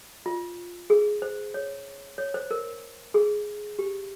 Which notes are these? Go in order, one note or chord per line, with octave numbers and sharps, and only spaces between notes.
F4
G#4
C5
C#5
C#5
C5
A#4
G#4
G4